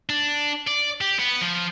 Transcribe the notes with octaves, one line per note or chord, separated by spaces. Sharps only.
D4
D5
G4
B3
F3